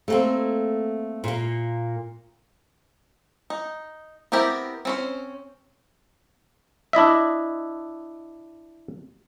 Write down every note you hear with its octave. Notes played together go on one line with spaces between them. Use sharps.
A3 A#3 C4
A#2 A#3
D#4
B3 C4 E4 G4 A#4
C4 C#4 C5
D4 E4 D#5 E5